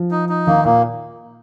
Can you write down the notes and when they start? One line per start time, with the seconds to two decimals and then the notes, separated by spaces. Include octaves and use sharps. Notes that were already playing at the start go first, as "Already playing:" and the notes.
Already playing: F3
0.11 D#4
0.29 D#4
0.47 D#3 A#3
0.65 A#2 A#3